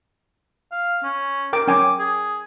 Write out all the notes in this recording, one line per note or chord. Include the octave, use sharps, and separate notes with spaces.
F5
C#4
A#4 G5 D6
C#4 G5 G#5 D6
G#4